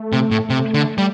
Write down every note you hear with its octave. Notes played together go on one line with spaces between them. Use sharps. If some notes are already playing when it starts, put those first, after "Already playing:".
Already playing: A3
C3
A2
C3
D3
G3